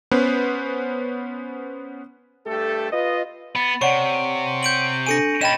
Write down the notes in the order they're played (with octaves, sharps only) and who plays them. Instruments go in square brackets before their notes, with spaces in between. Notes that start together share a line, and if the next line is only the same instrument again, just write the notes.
[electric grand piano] B3 C#4 B4 C5
[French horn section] G2 A3 G4 A4
F4 B4 D#5
[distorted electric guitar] B3 [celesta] B5 A6
[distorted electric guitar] C3 [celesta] C#5 D5 F#5 [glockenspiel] C#6
[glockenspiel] G6 D7 F#7
[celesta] D4 A4 G#5 [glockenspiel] A#6 C#7 D#7
[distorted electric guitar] A#2 C#4 [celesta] D#5 G5 B5 [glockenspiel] A6 E7